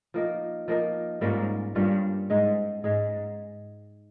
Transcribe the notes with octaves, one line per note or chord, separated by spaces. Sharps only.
F3 A#3 D#4 A#4
F3 A#3 D#4 A#4
G#2 G3 A#3 C#4 F4
G2 G3 A#3 C#4 F4
G#2 G#3 D#4 G#4
G#2 G#3 D#4 G#4